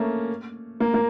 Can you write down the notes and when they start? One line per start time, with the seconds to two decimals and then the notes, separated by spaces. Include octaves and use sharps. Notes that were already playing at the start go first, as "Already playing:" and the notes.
Already playing: A3 A#3 C#4
0.80 A#3
0.94 A#3